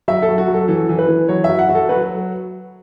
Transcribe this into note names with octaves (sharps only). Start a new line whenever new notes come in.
F#3 E5
A4
F#3
F#4
F#3
A4
E3 A4
E3
B4
E3
F#3 C#5
E5
F#3
F#5
F#3 F#4
A4
F#3 B4